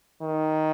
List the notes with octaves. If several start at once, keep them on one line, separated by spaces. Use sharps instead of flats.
D#3